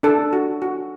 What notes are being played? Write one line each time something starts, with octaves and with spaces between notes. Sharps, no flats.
D4 A4
F#4
F#4